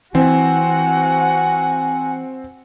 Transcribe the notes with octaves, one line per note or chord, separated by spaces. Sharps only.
E3 C4 F#4 F#5 G#5